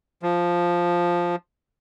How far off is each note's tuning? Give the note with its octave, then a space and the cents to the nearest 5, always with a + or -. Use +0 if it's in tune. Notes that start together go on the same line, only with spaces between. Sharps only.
F3 +0